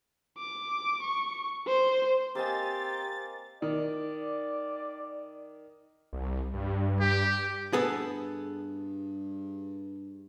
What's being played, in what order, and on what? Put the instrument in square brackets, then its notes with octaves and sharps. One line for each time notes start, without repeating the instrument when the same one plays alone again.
[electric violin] D6
C#6
C5
[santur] A#3 D#5 G#5 [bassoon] C4 [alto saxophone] G4 [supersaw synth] A6
[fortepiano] D#3 [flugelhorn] D5
[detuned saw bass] C2
G2
[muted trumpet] G4
[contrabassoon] G2 [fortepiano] B3 [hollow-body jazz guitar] G#4 A4